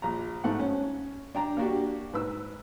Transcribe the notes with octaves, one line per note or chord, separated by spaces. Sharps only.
A#1 A#5
G#2 A3 F#5
C#4
D4 G5 A#5
A#3 D4 F#4 G4
G#2 B4 E6